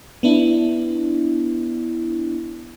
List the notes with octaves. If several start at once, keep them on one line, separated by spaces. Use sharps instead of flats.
B3 D4 E4